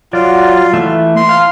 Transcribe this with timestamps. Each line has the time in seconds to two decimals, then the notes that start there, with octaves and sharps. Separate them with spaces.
0.13 F#3 F4 D5
0.74 E3 A3 E5
1.16 C6
1.29 F5